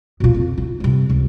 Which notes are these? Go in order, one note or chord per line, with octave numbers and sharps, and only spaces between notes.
B2 F4
F2 C#3
E4
G2 C3
C#2